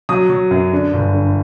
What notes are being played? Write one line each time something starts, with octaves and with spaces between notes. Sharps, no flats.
F#3 D#6
F#3
F#2
D3
G1
D3